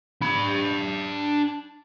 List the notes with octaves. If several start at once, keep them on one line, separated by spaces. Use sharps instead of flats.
D4 B5